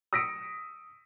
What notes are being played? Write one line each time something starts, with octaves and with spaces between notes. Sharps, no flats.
D#6 E6 A#6 B6 C#7 D7